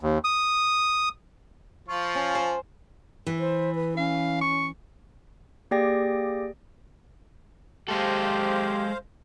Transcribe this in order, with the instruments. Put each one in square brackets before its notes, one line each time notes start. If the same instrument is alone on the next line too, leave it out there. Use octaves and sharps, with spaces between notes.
[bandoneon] D#2
D#6
[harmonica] F3 F4 C#6
[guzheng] C#4
C5 A5
[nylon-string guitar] E3
[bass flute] C5
B4
[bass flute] C#4 [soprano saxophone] F5
[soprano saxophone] C#6
[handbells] A#3 G4 G#4 D5 G5 A#6
[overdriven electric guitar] G#3 A4 [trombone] G4 [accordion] C5 F5